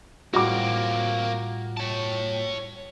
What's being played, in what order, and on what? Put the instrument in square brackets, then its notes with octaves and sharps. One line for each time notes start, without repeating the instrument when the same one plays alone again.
[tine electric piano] A2 G3 F4 [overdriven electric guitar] A#3 C4 [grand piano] F#4 D6
[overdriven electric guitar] C#5 A5